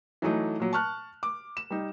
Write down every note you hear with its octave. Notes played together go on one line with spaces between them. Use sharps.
E3 F#3 A3 D#4
A#2 F#3
A5 C#6 F6 F#6
D6
E7
G3 D#4